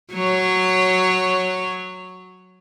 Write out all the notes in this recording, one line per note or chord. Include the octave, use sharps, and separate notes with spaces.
F#3 C#5